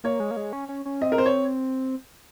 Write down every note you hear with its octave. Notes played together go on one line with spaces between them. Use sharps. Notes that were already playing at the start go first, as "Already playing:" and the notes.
A#3 C#5
G#3
A#3
G#3
C#4
C#4
C#4
C4 D#5
A#4
C5
C#5